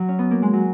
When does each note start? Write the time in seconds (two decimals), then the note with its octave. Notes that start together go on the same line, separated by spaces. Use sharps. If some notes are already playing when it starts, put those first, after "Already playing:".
Already playing: F#3
0.08 C#4
0.19 B3
0.31 A#3
0.42 G#3
0.53 F#3